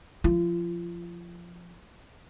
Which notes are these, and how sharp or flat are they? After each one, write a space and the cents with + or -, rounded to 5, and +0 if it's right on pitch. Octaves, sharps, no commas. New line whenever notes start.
F3 +0 F4 -35